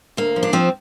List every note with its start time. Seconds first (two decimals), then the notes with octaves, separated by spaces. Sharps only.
0.17 D2 A#3
0.36 F3
0.43 D4
0.53 F3 C4